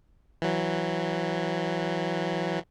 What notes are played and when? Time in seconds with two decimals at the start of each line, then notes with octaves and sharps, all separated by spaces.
0.42 E3 F#3